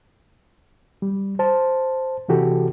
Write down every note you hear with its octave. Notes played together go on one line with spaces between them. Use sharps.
G3
C5 A5
C3 E3 F#4 G4 A4